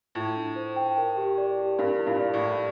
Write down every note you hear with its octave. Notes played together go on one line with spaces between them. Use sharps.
A2 F4
D4
C5
G5
A#4
G4
D5
G4
G2 A#4
E4
G2 A#2
D5
A2
E4